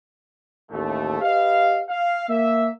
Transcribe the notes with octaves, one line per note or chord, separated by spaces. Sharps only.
A1 D#2 A3
G4 B4 D#5 F5
F5
A#3 E5